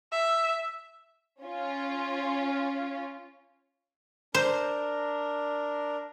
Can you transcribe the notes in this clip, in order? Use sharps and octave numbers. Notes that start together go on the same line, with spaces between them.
E5
C#4 F4
D4 A#4 C5